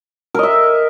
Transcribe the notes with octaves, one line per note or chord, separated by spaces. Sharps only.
A#4 D#5 E5